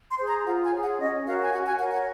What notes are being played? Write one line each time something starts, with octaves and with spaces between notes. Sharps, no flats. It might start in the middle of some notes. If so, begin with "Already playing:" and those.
C6
G#4 C5
A#5
F4 F#5
G#5
G#4 C#5
F#5
C#4 D#5
F#4 A#4 C#5 F5
G#5
F#4 F#5
G#5
A#4 C#5 F#5
F#5